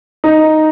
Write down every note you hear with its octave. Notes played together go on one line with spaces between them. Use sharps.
D#4